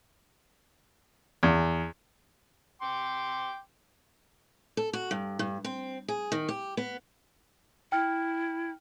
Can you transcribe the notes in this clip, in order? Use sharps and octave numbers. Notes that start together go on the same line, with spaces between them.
E2
G5 C6 D6
A4
F#4
G2
G2
C4
G#4
D#3
G4
B3
E4 G5 F6